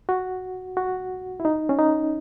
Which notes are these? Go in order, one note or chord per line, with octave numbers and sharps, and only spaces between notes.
F#4
F#4
E4
D#4
C#4
D#4